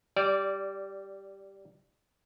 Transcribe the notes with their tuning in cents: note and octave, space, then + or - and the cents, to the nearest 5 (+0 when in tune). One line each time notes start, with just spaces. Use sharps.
G3 +0 D5 -20